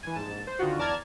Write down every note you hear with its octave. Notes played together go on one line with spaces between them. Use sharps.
E3 G#5
A#1 G#2 A5
C5
D3 D#3 F4 F#4
E2 D5 A5 A#5 F6 G#6